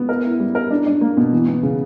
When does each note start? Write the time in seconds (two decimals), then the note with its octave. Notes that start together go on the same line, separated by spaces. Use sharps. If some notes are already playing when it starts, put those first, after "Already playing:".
Already playing: B3
0.09 A#4
0.24 E4
0.40 G3
0.55 A#4
0.71 D4
0.86 D4
1.01 A#3
1.17 B2
1.33 E3
1.48 B3
1.63 C#3